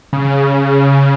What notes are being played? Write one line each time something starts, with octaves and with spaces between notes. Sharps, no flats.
C#3